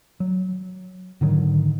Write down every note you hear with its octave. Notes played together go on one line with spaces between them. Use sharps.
F#3
G#2 D3 D#3 F#3